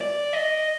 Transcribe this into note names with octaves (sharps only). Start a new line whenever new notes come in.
D5
D#5